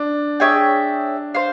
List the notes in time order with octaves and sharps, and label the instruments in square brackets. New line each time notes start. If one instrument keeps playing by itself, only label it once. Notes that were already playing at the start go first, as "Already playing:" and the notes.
Already playing: [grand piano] D4
[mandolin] G#4 C#5 E5 G5
C5 F5